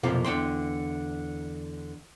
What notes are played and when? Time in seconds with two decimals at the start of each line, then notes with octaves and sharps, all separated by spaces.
0.03 B1 F2 C3 A#3 F4 F5
0.24 E2 D3 G5 C6